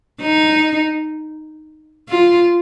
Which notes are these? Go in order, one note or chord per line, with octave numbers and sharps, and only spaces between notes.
D#4
F4